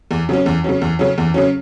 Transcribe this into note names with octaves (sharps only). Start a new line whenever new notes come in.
E2
C#3 F#3 C#4
E2
C#3 F#3 C#4
E2
C#3 F#3 C#4
E2
C#3 F#3 C#4